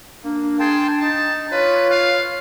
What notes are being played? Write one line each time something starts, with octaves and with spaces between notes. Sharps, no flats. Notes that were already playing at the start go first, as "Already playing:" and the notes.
A#3 D4
G#4 G5 A5 C6
D#4 A5
F4 B4 C#5
F5